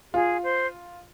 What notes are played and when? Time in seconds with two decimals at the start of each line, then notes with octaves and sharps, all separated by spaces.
0.14 F4 G#4
0.43 C5